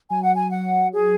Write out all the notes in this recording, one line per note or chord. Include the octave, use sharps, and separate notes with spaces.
F#3 G#5
F#5
G#5
F#3 F#5
G#4